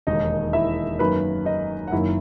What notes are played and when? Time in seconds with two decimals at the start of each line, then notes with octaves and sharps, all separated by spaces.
0.07 E1 D#2 D#3 D#4 D#5
0.53 E4 E5
0.99 F#2 D#3 A#3 B4 B5
1.45 D#4 D#5
1.88 F#5
1.92 F#1 F#2 D#3 A#3 E4 E5